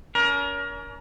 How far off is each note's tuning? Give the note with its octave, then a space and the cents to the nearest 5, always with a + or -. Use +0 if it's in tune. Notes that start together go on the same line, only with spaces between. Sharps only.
C#4 +45 A#4 +25